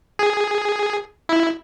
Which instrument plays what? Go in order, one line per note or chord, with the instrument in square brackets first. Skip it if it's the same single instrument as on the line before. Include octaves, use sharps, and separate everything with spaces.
[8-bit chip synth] G#4
E4